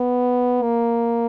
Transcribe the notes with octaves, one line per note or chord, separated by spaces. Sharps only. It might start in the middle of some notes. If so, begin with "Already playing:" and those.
Already playing: B3
A#3